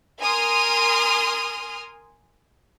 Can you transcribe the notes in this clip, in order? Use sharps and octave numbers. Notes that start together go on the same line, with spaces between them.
A#4 G#5 C6 D#6 F6